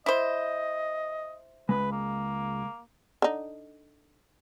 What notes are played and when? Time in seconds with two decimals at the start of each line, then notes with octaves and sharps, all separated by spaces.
0.06 E4 C5 D#5
1.69 C#2 G#3 B4
1.92 A#3
3.22 D3 D#4